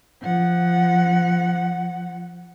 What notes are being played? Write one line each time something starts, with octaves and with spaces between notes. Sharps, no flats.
F3 F#5